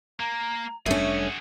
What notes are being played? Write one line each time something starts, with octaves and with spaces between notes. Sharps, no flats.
A#3 A#5
F1 G3 A3 C#4 D4 F#4 G#4 E5